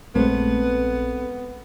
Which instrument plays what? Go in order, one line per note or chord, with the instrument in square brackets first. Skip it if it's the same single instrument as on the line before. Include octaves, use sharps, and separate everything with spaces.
[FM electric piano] A#1 G#3 [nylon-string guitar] A3 C4 [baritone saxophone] B3